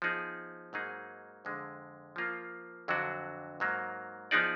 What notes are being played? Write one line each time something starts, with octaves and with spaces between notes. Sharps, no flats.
F3 B3 D#4 G#4
G#2 F#3 A#3 D#4 G#4
F2 D3 G#3
F3 A#3 F4
F2 D3 F#3 D4 F#4
G#2 F#3 A#3
F3 B3 D#4 G#4 D5